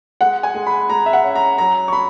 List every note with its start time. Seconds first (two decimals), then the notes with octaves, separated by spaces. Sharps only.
0.21 G#3 F#5
0.43 G#5
0.54 G#3
0.67 B5
0.90 G#3 A#5
1.06 E5
1.13 F#5
1.24 C#4
1.35 A#5
1.58 F#3 A#5
1.88 C#6
1.93 B5